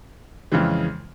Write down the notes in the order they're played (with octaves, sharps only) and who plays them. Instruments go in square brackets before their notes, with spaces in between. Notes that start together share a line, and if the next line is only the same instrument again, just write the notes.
[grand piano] F2 C#3 E3 G#3